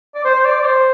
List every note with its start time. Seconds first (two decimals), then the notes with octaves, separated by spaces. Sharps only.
0.15 D5
0.24 C5
0.35 C5
0.45 D5
0.55 D5
0.65 C5